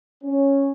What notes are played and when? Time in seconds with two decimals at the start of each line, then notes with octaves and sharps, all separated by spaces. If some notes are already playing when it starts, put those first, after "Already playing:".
0.24 C#4